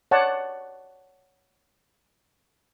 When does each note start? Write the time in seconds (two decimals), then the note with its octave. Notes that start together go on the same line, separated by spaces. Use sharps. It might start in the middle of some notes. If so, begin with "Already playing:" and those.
0.11 C#5 D5 F#5 A5